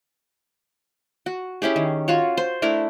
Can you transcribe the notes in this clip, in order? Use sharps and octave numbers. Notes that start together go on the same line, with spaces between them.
F#4
C#4 E4 G4 G#4
D#3
F4 F#4 C#5
C5
A3 D4 E4 A#4